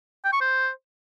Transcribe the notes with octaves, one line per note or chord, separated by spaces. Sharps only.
G5
C#6
C5